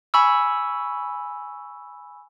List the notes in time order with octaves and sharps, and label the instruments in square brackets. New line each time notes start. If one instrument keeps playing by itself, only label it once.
[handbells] G#5 B5 C#6 E6